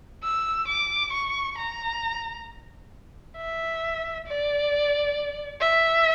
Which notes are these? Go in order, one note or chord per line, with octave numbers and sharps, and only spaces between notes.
E6
D6
C#6
A#5
E5
D5
E5